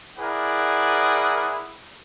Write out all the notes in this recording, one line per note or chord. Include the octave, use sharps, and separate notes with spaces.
E4 G#4 A#4 C5 D5 F#5